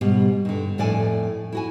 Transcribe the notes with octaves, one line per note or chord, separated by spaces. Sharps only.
G#2 B2 G3
G2 D3
F2 A2 A4 D5 G#5
E4 F#4 G#5